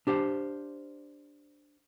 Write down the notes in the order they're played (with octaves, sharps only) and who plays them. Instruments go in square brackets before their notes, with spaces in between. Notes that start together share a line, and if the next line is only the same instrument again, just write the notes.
[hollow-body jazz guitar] D4 G4 C5 F5